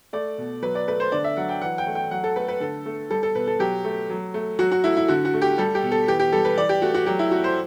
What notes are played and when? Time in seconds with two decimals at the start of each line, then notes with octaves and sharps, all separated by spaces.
0.13 A3 D5
0.38 B2
0.62 F#3 B4
0.75 D5
0.88 A3 B4
1.00 C5
1.12 D3 D5
1.24 E5
1.37 F#3 F#5
1.49 G5
1.61 E3 F#5
1.78 G5
1.87 A3
1.95 G5
2.11 F#3 F#5
2.24 A4
2.36 A3 B4
2.48 B4
2.60 D3 A4
2.86 A3
3.10 G3 A4
3.23 A4
3.35 B2 B4
3.47 A4
3.59 F#3 G4
3.84 A3
4.10 F#3
4.34 A3
4.59 F#3 F#4
4.72 F#4
4.84 A3 E4
4.97 E4
5.08 D3 F#4
5.25 F#4
5.34 A3
5.42 G4
5.58 G3 A4
5.75 G4
5.83 B2
5.92 A4
6.08 E3 G4
6.19 G4
6.32 G3 A4
6.45 B4
6.58 E3 D5
6.69 G4
6.82 A3 F#4
6.94 F#4
7.06 F#3 G4
7.19 E4
7.31 A3 F#4
7.44 C5